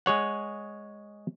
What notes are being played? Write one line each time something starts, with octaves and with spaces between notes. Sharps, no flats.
G#3 G#4 C#5 F#5